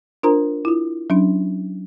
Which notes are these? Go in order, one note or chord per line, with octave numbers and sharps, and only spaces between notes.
D4 F4 A#4 C5 A#5
E4 F4
F#3 C#4 D4